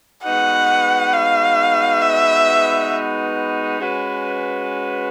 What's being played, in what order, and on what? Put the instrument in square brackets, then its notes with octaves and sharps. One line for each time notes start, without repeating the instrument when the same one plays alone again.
[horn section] G#3 B3 D#4 F#4 B4 [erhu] F#5
[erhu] F5
E5
[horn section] G#3 C#4 F#4 B4